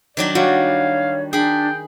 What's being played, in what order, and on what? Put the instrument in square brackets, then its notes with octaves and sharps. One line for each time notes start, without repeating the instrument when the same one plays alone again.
[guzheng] D#3 F#3 D4 [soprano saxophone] D5
[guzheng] G3 [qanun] F#4 [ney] C#5 [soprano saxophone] F5
[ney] D4 [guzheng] G#4 B5 [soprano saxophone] G5